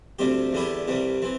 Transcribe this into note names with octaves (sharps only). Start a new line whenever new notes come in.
D2 C3 G3 C4 G4
E2 D3 G3 E4 G4
C2 C3 E3 G3
E3 C4